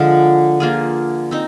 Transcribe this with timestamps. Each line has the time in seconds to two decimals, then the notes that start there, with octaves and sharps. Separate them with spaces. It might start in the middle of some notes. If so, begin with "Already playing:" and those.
Already playing: D3 F3 G#3
0.60 A#3 F4 G#4
1.31 C4 D#4